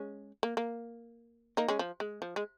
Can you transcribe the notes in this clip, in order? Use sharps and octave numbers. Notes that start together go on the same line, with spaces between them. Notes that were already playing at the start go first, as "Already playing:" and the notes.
Already playing: G#3 C#4
A#3
A#3
A#3 D#4
G#3 C#4
F3
G#3
F3
G#3